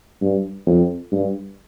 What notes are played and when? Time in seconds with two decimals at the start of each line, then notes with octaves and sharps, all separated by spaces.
0.21 G2
0.67 F2
1.12 G2